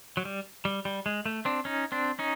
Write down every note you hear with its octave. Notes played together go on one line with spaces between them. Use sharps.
F#3
G3
G3
G3
G#3
A3
C4 D4
C#4 D#4
C4 D4
C#4 D#4